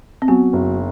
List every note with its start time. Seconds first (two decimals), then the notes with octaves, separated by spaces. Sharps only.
0.22 C4
0.28 F#3 B3
0.53 F#1